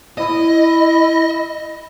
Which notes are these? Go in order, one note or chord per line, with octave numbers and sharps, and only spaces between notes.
E4 D#5